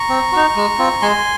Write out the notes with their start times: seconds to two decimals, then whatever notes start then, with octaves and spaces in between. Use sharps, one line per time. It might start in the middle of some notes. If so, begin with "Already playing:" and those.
Already playing: A#5 C#6
0.09 C4
0.33 D#4 F#4
0.56 G#3
0.79 C4 F4
1.02 G#3 G#5 C6